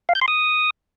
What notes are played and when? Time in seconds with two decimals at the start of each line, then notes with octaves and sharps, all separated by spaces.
0.09 F5
0.15 G6
0.21 C6
0.28 D#6